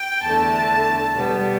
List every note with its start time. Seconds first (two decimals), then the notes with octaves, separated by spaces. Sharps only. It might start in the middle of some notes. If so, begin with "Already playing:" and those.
Already playing: G5
0.22 E2 D3 A3 A5
1.15 B2 G3 B3